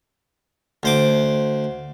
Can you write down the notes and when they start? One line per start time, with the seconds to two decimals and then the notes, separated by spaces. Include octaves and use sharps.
0.83 D2 C5 D6